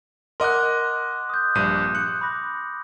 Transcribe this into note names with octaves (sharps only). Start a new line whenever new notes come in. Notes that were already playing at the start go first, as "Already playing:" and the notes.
A#4 D#5 F#5 C6 D6 F#6
D#6 G6
A#1 G2 D#7
F#6 C#7
B5 D6 A#6